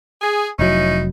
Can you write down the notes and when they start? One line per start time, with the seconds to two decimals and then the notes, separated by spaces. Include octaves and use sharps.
0.22 G#4
0.59 F1 F#3 C#4 D#4 E4